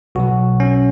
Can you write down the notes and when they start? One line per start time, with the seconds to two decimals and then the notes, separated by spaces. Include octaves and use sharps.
0.15 B1 B2 F#3 F#4
0.60 C#4